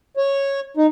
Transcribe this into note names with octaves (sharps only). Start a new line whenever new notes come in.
C#5
D#4